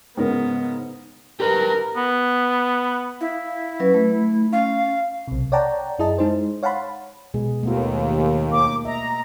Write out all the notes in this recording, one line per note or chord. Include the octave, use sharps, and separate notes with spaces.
G#2 C#3 B3 A#4
G4 A#4 B4
B3
E4 F5
F#3 C#4 B4
A3
C#4 F5
B1 C3
C#5 D5 F#5 G5 A5 A#5
F#2 E4 G#4 D#5 A5
G#3 D#4 G#4 C5
C#5 F5 F#5 A5 B5 C6
B2 G#3 G#4
D#2 A3 B3 F4
A#3 D6
D#5 E5 A#5